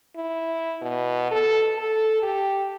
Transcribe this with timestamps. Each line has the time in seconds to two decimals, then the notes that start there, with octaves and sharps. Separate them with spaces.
0.16 E4
0.82 B2
1.31 A4
1.78 A4
2.23 G4